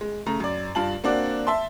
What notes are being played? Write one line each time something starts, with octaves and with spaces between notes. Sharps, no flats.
G#3
C#3 A3 A#5
F#2 D5
G2 F4 A5 F#7
A#3 C4 D4 F#4 D5
E5 A5 C6